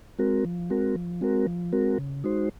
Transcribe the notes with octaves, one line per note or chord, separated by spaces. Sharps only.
G#3 C4 F#4 A#4
F3
G#3 C4 F#4 A#4
F3
G#3 C4 F#4 A#4
F3
G#3 C4 F#4 A#4
C#3
G#3 D#4 F#4 C5